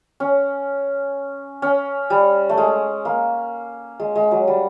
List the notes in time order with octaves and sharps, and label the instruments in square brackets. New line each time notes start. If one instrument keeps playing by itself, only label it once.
[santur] C#4
C#4
G3
A3
G#3
A#3
G#3
G#3
F#3
G3